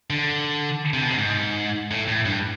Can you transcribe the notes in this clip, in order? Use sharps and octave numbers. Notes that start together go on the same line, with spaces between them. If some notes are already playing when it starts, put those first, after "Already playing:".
D3
C3
B2
C3
G#2
A2
A2
G2